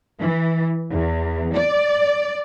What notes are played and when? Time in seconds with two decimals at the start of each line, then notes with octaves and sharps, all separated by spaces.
0.20 E3
0.91 E2
1.54 D5